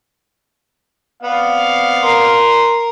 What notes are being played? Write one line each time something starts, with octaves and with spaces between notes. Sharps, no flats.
B3 C4 D5 F5
A#4 C6